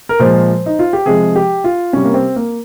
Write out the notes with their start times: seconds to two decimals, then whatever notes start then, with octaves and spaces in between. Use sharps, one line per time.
0.09 A#4
0.19 A#2 F3 G#3 C5
0.66 D#4
0.79 F4
0.93 G4
1.06 C3 F3 G#3 G#4
1.36 G4
1.64 F4
1.93 C3 G3 C#4
2.05 A#3
2.14 C4
2.36 A#3